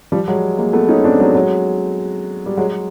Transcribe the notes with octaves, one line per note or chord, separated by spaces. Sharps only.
F3 G3
F#3 G#3
G#3 A#3
A3 B3
C#4 D#4
C4 D4
F#3 G#3
F#3 G#3
G3
F#3 G#3